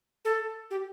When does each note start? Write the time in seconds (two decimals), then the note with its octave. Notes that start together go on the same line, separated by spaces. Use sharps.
0.25 A4
0.71 G4